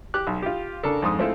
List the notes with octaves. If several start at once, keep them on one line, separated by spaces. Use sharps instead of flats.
G4 D6 F#6
B1
F4 G4
C#3 D4 A4 A#4
F2 G#2 C6 D#6
G#3 A3 C4 E4 F4 A4